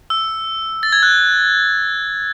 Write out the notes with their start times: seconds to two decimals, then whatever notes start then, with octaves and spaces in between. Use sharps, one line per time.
0.10 E6
0.83 A6
0.93 G#6
1.03 F#6